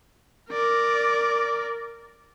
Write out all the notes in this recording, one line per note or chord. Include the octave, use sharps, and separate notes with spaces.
A#4 D5